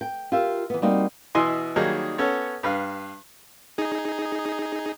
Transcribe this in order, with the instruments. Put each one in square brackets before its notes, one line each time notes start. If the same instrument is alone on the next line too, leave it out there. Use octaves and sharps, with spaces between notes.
[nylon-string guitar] G5
F4 G4 A#4 E5
E3 B3
G3 A#3 C4 D#4 F#4
[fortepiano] B2 E3 E4 D#5 G#5 C6
D#3 F#3 G3 A#3 D#4 G#4
B3 C#4 A4 C#5
G2 B4 F5
[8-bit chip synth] D#4 G#4